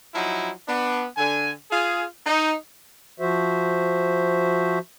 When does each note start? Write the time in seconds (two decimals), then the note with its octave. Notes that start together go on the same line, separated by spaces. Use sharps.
0.14 F3 F#3 D#4 E4
0.68 B3 D4
1.17 D3 G#5
1.71 F4 G#4
2.26 D#4
3.20 F3 F#4 C5 E5